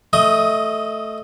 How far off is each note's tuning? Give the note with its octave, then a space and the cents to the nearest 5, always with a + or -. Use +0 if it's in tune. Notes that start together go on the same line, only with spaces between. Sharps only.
A3 +0 D#5 +0 D#6 +20